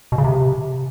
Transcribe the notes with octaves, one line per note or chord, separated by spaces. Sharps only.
B2
C#3
C3